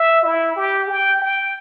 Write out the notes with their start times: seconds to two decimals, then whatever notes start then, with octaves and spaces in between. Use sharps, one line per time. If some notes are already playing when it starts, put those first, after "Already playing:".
Already playing: E5
0.25 E4
0.56 G4
0.89 G5
1.22 G5